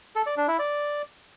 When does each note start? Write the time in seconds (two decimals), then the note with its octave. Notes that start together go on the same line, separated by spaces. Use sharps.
0.16 A4
0.26 D5
0.37 D4
0.48 E4
0.59 D5